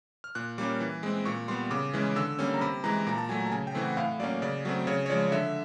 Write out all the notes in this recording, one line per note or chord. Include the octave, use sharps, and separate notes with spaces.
F6
A#2 F#6
G3 A#3 C#4 D6
E3
G#3 C4
A#2 C#6
G3 B3 C6
C#3 D6
E3 G#3 C#4
D3 E6
G3 A#3 C#4
A#5
C3 B5
E3 G#3 A#5
A#2 A#5
A5
F#3 A3 G#5
G#5
A5
C#3 G#5
G5
E3 A3 C4
F#5
A2 F5
F#3 A#3 C#4 D5
C#3 D5
F#3 A3 C4
C#3 C#5
C#5
F3 G#3 D5
D3 E5